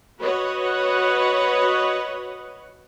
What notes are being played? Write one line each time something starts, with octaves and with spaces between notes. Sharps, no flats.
F#4 B4 C#5 D#5 F#5